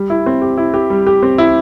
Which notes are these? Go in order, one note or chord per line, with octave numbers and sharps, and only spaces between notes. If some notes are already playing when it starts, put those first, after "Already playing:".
Already playing: G3
E4
C4
G4
E4
G4
G3
G4
C4
E4